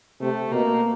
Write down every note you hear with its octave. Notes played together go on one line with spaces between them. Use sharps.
C3 A3
B2 A#3